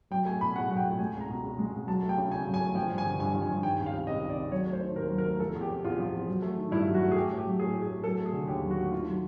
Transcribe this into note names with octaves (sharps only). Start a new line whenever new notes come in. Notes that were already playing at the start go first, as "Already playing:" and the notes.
F#3 G5
A3 G#5
B2 B5
E2 F#5
F#3 F#5
G5
A3
G#3 G#5
C#2
A#5
B2
C#2
G#3
C#2
F#3 A5
A3
G5
C#3
E2 G#5
F#3
G#5
A3
F3 G5
G2
G#5
D3
G2 G#5
F3
G#5
G2
D#3 G5
C#2
F5
C3
C#2 D#5
D#3
D5
C#2
F#3 C#5
A3
C5
D#3
D#2 A#4
F#3
A#4
A3
F3 A4
E2
G4
C3
E2 F4
F3
E2
F#3
A3
D#3
G2 E4
F#3
F#4
A3
G#4
A3 G4
A2
G4
F#3
A2 G#4
A3
G#4
A2
F#3 A4
A3
G#4
D3
D#2 G4
F#3
F#4
A3
D#3 F4
F#3